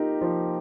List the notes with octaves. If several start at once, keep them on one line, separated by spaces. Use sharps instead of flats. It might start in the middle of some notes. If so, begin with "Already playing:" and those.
Already playing: A#3 D#4 F4 G4 A#4 D#5
F3